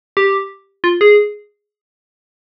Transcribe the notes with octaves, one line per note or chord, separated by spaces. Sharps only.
G4
F4
G#4